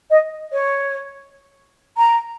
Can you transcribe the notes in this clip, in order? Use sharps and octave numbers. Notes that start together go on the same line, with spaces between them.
D#5
C#5
A#5